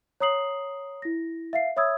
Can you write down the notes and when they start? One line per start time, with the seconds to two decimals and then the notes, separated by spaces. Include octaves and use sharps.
0.20 C#5 A#5 D#6 C7 F#7
1.02 E4 A#6
1.53 E5 F5 C7
1.76 C#5 E5 B5 D#6 E6 G#6